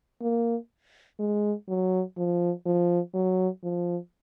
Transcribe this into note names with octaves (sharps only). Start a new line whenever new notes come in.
A#3
G#3
F#3
F3
F3
F#3
F3